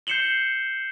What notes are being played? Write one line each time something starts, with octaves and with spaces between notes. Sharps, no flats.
G6 C7 C#7 E7 F#7 G7